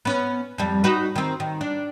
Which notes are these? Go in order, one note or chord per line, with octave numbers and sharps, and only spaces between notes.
B3 C#4
F2 G3
D#4 F#4 B4
D#3 C4
D#3
D4